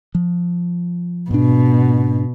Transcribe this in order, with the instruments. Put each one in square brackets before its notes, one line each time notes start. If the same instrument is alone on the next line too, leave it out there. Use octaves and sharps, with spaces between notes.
[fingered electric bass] F3
[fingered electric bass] G#2 D4 [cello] B2